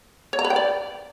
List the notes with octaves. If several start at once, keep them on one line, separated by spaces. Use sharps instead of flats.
C#5
A#5
B4
G5
D5